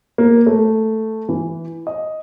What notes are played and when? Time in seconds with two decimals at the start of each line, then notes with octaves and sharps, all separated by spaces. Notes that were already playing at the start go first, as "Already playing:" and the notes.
0.18 A#3
0.46 A3
1.29 E3
1.87 D#5